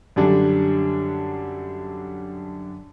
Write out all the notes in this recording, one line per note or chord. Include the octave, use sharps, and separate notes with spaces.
F#2 D3 G3 D4